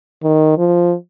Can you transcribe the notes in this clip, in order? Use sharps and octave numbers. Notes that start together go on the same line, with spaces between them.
D#3
F3